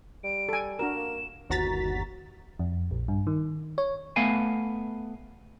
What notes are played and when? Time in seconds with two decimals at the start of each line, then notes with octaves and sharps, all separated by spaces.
0.24 G3 D7
0.49 A4 G#5
0.79 D4 F#4 A#4 E7
0.96 A#3
1.50 G1 D#2 F#4 A#5 A6 B6
2.59 F2
2.91 A#1
3.08 G2
3.27 D#3
3.78 C#5
4.16 A3 B3 F5 G#5